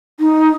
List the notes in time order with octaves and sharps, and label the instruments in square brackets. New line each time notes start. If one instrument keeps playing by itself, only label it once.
[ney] D#4